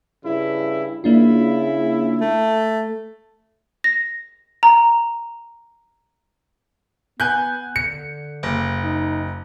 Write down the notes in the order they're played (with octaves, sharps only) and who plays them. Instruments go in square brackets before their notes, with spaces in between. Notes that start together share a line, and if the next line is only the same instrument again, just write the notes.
[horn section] G2 C#3 E4
[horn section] C#3 E4 [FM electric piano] A#3 D4 F4
[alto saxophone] A3
[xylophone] A#6
A#5
[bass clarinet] B3 [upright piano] G#5 F#6 G6
[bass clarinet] D3 [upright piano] C#7
[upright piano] F#1
[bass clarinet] D#4